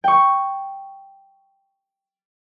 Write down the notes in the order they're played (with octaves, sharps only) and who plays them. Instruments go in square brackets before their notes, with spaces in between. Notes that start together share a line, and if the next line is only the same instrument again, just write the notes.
[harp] G5 C#6